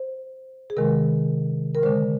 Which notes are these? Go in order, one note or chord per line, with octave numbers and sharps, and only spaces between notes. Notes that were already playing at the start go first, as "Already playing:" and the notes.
Already playing: C5
G#4
C3 D#3 G#3 A#4
A#4
D3 G#3 C5